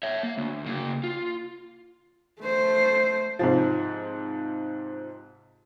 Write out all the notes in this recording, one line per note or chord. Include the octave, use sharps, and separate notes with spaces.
C#5 E5
A#3
D2
C#3 A#3
F4
A3 C5
G#2 C3 F3